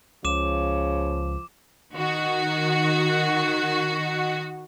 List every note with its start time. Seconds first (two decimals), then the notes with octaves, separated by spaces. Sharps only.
0.25 C#2 C#3 F3 D6 E7
1.94 D#3 F#4